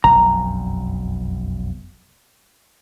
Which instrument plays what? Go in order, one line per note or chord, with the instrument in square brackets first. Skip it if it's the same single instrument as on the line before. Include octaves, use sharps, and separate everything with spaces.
[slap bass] F1 B1 F#2 [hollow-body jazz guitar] A#5